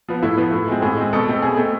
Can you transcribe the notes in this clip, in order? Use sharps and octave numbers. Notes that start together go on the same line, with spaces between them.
F3 B3
A2 E4
F3 B3
A2
G#3 C4
A2 G#4
G#3 C4
B2 A4
A3 C4
B2 G#4
A3 C4